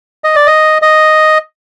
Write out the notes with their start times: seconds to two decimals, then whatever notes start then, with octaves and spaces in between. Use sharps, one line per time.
0.24 D#5
0.36 D5
0.47 D#5
0.82 D#5